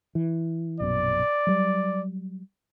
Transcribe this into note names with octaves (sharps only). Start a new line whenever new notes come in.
E3
A#1 F#2 B2 D5
F#3 G3